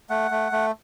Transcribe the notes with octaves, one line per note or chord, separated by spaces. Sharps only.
A3 F#5
A3
A3